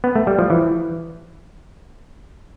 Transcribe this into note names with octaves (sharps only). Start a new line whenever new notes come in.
B3
A3
G3
F3
E3